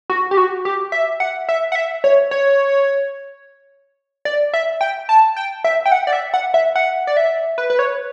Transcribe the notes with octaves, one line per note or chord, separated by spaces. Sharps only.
F#4
G4
F#4
G4
E5
F#5
E5
F#5
E5
C#5
C#5
D5
E5
G5
A5
G5
E5
G5
F#5
D5
E5
F#5
E5
F#5
D5
E5
B4
B4
C#5